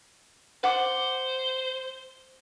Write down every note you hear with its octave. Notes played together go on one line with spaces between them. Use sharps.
C5 F#5 D6